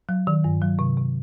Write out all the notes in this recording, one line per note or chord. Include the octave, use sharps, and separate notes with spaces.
F#3
D#3
G2
F#3
C3
C3